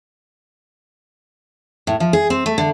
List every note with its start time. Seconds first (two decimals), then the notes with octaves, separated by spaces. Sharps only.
1.87 A2
2.00 F3
2.13 G#4
2.30 C4
2.46 A3
2.58 D3